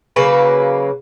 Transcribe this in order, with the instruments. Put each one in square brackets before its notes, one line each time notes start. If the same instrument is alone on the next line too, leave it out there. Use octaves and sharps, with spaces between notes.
[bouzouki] C#3 F#3 A#3 B4